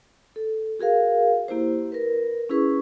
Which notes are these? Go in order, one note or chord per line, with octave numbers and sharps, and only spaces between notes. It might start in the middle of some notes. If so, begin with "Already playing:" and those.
A4
F#4 G#4 A#4 F5
A#3 E4 G4 C5
A#4 B4
C#4 E4 G#4 B4 C#6